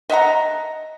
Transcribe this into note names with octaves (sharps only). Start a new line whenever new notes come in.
D#5 E5 F#5 A#5